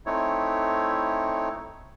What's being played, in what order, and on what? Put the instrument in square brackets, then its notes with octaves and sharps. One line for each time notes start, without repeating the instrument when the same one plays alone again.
[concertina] A3 C4 D#4 E4 C#5